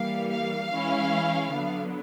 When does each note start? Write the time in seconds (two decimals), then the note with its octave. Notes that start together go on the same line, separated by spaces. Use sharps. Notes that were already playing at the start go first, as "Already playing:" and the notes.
Already playing: E3 G3 A#3 F5
0.31 F5
0.72 E3 G#3 C#4 E4
1.52 D3 F#3 B3